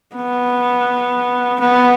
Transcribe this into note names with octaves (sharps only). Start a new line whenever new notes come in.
B3
B3